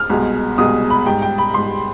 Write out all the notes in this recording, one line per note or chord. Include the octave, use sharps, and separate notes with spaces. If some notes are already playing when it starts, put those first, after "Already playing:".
Already playing: F6
C2 B2 G#3
C2 B2 G#3 D#6
B5
G#2 G3 G5
G5
B5
G#2 G3 C6